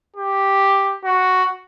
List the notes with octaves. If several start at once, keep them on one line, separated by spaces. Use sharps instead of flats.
G4
F#4